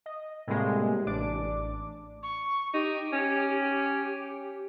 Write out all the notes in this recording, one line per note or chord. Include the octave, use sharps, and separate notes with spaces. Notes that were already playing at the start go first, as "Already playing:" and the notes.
D#5
A2 C3 G3 G#3 A#3
A1 D4 D6
C#6
D#4 G4
C#4